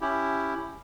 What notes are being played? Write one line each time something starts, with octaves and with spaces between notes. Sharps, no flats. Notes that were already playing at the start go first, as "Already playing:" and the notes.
C#4 E4 G4